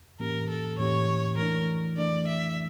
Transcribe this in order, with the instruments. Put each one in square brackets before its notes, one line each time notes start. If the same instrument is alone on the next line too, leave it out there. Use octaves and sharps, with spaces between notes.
[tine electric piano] A2 E3 A#3 C#4 G4 [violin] A#4
[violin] A4
[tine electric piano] A2 E3 A#3 C#4 G4 [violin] C#5
[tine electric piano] E3 A3 D4 [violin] A#4
[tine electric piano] E3 A3 D4 [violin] D5
[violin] E5